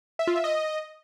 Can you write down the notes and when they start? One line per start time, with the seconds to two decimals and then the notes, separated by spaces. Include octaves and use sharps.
0.19 E5
0.27 F4
0.36 E5
0.44 D#5